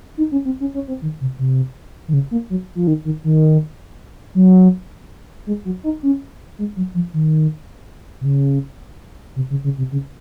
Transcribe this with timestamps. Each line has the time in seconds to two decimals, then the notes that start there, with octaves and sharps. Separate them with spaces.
0.17 D#4
0.32 C#4
0.45 C4
0.60 C#4
0.74 C#4
0.88 C4
1.02 D#3
1.21 C3
1.39 C3
2.08 D#3
2.13 C#3
2.31 A#3
2.50 F#3
2.75 F3
2.87 D#3
3.05 D#3
3.24 D#3
4.35 F#3
5.47 G#3
5.65 F#3
5.84 D#4
6.03 C#4
6.58 G#3
6.77 F#3
6.94 F3
7.14 D#3
8.21 C3
8.25 C#3
9.36 C3
9.50 C#3
9.64 C#3
9.78 C3
9.92 C#3